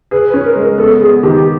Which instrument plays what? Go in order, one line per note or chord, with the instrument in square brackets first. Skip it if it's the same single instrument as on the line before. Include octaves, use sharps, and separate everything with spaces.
[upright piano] G#4 [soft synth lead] B4
[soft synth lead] B4
[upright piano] C#4
[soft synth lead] A#4
[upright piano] G#3
[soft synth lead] A#4
[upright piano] B3 [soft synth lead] A4
[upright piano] B3 [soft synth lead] G#4
[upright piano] D#3 [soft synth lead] G4
[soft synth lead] G4